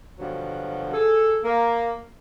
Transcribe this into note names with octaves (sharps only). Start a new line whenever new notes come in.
G2 B2 D3 F3 F#3
G#4 A4
A#3